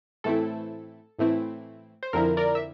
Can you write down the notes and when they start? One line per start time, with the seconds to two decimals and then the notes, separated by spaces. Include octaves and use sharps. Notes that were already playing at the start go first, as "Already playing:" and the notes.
0.24 A2 E3 A3 C4 E4 A4
1.19 A2 E3 A3 C4 E4
2.03 C5
2.13 F2 D3 F3 C4 E4 A#4
2.37 A#4 D5
2.55 E5